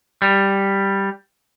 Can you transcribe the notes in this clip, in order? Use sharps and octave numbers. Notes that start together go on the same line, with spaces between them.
G3